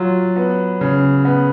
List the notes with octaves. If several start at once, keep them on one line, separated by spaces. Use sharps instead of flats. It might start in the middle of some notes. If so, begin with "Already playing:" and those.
Already playing: F#3 F4
B3
C#3
B3